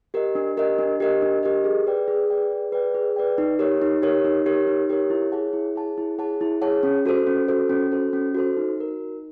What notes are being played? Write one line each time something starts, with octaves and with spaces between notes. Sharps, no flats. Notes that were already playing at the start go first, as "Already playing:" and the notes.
G4 A#4 D#5
D4
G4 A#4 D#5
D4
G4 A#4 D#5
D4
G4 A#4 D#5
G#4
B4 D5 G5
G#4
B4 D5 G5
G#4
B4 D5 G5
G#4
B4 D5 G5
D#4
G4 A#4 C#5
D#4
G4 A#4 C#5
D#4
G4 A#4 C#5
D#4
G4 A#4 C#5
E4
G#4 C#5 F#5 A5
E4
G#4 C#5 F#5 A5
E4
G#4 C#5 F#5 A5
E4
G#4 C#5 F#5 A5
C#4
F#4 A4 C5
C#4
F#4 A4 C5
C#4
F#4 A4 C5
C#4
F#4 A4 C5
D#4
F#4 A#4
D#4